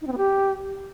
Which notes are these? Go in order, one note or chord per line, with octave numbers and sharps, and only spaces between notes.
D#4
C4
B3
G4